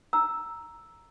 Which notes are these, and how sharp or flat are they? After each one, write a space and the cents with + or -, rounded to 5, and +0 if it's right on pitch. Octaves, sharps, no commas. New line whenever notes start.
A#5 +0 E6 +0